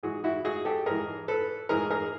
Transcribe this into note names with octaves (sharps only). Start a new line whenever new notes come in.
G#2 E3 F#4 G#4
E4 F#4
F#4 G#4
G4 A4
G#2 E3 G#4 A#4
A4 B4
G#2 E3 G#4 A#4
G#4 A#4